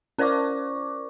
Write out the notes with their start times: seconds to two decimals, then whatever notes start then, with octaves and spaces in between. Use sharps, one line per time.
0.18 C#4 A#4 C5 D5 C#6 D6